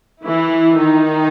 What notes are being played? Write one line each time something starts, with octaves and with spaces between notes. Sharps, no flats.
E3 E4
D#3 D#4